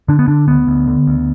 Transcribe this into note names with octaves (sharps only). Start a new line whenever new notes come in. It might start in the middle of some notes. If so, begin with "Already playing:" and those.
D3 D4
B3
D3 D4
D2 B3
D2
D3
D2